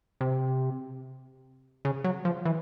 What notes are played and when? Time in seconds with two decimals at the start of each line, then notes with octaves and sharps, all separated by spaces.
0.21 C3
1.85 C#3
2.04 F#3
2.25 F3
2.45 E3